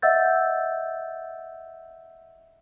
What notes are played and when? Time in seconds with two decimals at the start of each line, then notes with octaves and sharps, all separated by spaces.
0.02 D#5 E5 F#5 E6 G6 A6